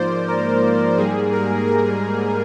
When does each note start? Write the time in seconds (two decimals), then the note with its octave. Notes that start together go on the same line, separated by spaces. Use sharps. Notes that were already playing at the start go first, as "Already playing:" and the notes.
Already playing: G#2 F3 A#3 C5 D5
0.28 A#4
0.97 G#2 G3 A#3 G#4
1.32 A#4
1.66 A#4